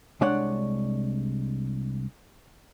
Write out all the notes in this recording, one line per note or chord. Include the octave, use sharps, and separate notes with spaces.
C2 G#3 D4 C#5 D5 F#5